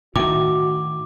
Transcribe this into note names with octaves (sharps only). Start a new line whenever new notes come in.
A2 D#3 F#4 D6